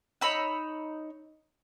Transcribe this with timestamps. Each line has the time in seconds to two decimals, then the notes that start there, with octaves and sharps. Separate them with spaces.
0.21 D#4 C#5 B5 E6